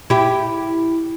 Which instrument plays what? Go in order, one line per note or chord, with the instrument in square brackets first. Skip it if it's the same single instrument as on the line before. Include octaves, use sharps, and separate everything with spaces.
[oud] E4 G4